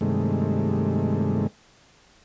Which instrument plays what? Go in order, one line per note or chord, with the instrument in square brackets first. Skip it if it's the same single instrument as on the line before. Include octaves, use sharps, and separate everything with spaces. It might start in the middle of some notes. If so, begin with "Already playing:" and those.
[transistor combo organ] G2 C3 D#3 G#3 A3